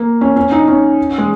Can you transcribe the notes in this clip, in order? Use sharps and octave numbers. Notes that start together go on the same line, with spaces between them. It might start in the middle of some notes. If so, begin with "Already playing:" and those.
Already playing: A#3
C#4
C#4
D#4
C#4
G#3